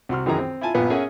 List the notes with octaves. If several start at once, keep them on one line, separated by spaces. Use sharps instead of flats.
C2 F#4 C6 F6
F#2 D#3 E3 G#4 A#5
C4
E4 F4 G#5 A5
A#1 G2 A#2 B3 F5 G#5
C#4 G#4 A#4 E5 F#5 G#5